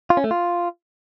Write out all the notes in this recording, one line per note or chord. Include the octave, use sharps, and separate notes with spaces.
F4
C#4
A3
F4